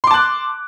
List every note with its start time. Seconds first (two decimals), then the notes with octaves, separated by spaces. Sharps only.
0.04 C6
0.07 D6
0.11 A5
0.14 F#6